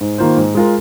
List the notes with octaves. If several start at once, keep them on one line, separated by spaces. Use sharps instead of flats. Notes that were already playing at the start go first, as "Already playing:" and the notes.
G#2
D#3 A#3 F4 C5
G#2
G#3 F4 A#4